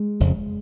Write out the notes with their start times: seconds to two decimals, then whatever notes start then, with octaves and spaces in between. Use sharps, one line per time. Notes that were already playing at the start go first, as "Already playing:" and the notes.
Already playing: G#3
0.20 F1 F2 C#3